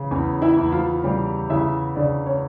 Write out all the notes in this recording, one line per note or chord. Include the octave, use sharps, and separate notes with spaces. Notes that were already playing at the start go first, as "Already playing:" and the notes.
Already playing: C#3 E3
E2 C#4 C#5
E4 E5
E2
F3 F4
C#3 G3 G4
C#3 E4 E5
C#3 D4 D5
C#4 C#5